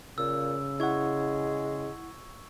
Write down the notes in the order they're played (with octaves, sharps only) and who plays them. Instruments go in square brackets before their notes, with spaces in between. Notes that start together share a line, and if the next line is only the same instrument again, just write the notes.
[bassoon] A#2 [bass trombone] C#3 [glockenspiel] E6
[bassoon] G#3 [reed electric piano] E4 F#5 [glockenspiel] C#6 G#6